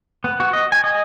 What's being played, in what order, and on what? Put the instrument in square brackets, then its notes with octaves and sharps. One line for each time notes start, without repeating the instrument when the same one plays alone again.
[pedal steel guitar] B3
F#4
D#5
G#5
D#5